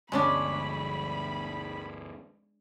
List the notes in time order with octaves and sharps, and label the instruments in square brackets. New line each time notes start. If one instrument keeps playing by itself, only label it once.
[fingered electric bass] G1 D2 [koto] G#3 C#4 D4 [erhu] B5